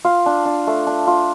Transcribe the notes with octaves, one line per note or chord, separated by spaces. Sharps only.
F4 F5
D4
D4
A3
D4
F4